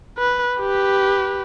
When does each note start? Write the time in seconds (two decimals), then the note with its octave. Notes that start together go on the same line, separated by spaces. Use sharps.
0.18 B4
0.60 G4 B4